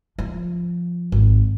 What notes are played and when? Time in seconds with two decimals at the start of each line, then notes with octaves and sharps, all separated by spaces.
0.19 F3
1.12 G#1